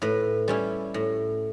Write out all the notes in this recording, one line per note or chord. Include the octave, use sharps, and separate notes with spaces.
A2 B4
G3 C#4 E4
A2